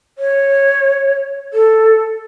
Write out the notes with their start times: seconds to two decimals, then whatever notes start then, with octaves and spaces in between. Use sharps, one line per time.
0.18 C#5
1.54 A4